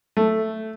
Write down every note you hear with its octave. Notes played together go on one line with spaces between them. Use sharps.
A3